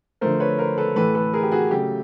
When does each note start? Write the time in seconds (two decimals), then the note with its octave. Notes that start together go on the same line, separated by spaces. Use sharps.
0.21 D3 F3 A3 A#4 C5
0.40 B4 C#5
0.59 A#4 C5
0.78 A4 B4
0.96 A2 E3 A3 A4 B4
1.15 A4 B4
1.34 G#4 A#4
1.43 G4
1.52 F#4 G#4
1.71 C#3 F#3 A3 G4